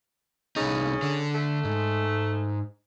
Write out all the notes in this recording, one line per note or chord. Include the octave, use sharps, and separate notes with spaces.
C2 C#3 D#4
D3
A3
G#2